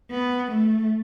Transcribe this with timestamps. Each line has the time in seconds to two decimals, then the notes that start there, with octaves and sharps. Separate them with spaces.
0.11 B3
0.51 A3